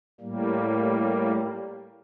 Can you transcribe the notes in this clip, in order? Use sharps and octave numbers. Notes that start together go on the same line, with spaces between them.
A2 G3 A#3